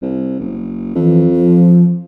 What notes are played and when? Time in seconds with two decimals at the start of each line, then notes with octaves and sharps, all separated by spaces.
0.02 C2
0.39 F#1
0.95 F2 E3
1.34 F3